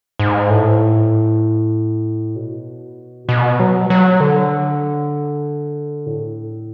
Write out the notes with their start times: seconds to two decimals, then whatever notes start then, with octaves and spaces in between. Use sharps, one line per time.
0.19 G#2
0.50 A2
2.36 B2
3.29 B2
3.60 F#3
3.90 F#3
4.20 D3
6.06 A2